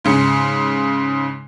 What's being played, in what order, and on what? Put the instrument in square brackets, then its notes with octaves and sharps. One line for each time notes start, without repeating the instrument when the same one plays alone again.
[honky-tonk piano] G#2 C#3 C#7